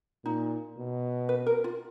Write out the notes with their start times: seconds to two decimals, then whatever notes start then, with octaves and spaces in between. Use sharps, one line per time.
0.24 A#2 D#4
0.78 B2
1.29 B4
1.46 A#4
1.64 F4